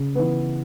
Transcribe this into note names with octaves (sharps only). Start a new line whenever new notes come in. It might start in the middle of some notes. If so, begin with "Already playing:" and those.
Already playing: C#3
E3 B3